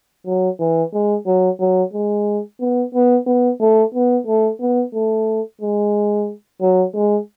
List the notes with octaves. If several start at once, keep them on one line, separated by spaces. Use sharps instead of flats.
F#3
E3
G#3
F#3
F#3
G#3
B3
B3
B3
A3
B3
A3
B3
A3
G#3
F#3
G#3